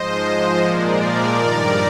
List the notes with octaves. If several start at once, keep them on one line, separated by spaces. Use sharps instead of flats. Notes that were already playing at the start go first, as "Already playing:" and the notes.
Already playing: G#2 F3 G#3 C5 D#5
C5 D#5
A#2 F3 G#3 A#4 D5
G2 D#3 G3 A#4 D5